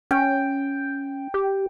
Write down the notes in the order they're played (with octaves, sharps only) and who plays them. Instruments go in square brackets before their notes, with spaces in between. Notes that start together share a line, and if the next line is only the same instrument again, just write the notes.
[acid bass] C#4 [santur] G5
[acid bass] G4